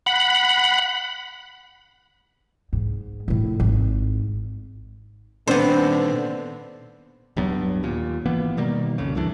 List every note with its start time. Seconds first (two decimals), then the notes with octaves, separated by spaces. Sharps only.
0.06 F#5 B5
2.73 G#2
3.28 A2 F3
3.60 G#1
5.47 A#2 D3 D#3 B3 C4 D4 C5
7.37 D1 G2 F#3 B3
7.83 D#2 A#2
8.26 G#1 E3 A#3 B3
8.57 B2 D#3 G3 A#3
8.98 B1 F2 C#3
9.15 C#2 G2 E3 D4